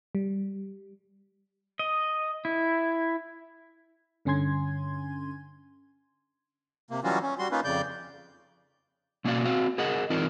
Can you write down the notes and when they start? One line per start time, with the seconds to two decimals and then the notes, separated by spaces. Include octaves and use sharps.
0.15 G3
1.79 D#5
2.45 E4
4.25 G2 D3 C#4 G#5 C6 G#6
6.91 C3 A#3
7.04 E3 F#3 G3 C#4 F4 F#4
7.22 C#4
7.39 G3 F#4 C6
7.51 A#3 C#4 D#4 F4 B4
7.64 F2 C#3 D5 G6
9.25 B2 A#3 C#4 F#4 D5 F5
9.45 C4 F#4 F5
9.78 G#4 A#4 D#5 F#5
10.10 E3 C4 D#4 F4 A#4 D5